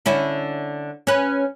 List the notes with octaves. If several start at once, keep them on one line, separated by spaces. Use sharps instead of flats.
D3 C#4 E4
C#4 B4